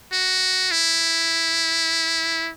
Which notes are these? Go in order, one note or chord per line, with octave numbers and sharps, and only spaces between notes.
F#4
E4